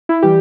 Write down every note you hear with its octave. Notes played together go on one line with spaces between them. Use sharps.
E4
E3 G3 G4